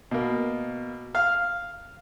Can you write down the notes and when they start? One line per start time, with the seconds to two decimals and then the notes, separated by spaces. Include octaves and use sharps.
0.11 B2 A#3
1.15 F5 F6